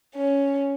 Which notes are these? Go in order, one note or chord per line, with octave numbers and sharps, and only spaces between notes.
C#4